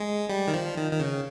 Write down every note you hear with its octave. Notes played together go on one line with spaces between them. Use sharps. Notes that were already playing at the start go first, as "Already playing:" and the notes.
Already playing: G#3
G3
D#3
F3
D#3
D#3
C#3